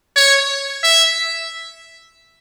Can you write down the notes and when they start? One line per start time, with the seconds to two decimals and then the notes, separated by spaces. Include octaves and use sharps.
0.16 C#5
0.84 E5